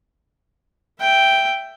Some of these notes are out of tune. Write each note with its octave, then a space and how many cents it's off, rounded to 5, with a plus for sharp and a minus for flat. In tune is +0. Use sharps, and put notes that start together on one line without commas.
E5 +0 G5 +0